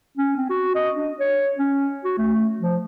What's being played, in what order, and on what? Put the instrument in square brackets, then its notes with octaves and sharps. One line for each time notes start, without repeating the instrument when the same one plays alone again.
[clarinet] C#4
C4
F#4
D#5
D4
C#5
C#4
F#4
A3
F3